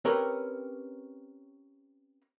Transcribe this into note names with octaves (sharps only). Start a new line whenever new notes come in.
C4 C#4 G4 A#4 B4 C#5